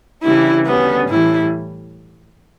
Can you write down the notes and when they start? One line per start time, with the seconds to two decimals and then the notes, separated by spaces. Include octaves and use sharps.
0.22 C#3 E3 G3 D4 E4
0.65 D2 D3 G3 B3 C#4
1.08 A2 E3 G3 E4